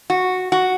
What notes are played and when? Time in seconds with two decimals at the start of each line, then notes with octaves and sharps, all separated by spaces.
0.10 F#4
0.52 F#4